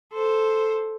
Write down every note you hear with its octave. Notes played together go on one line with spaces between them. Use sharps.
A4 C5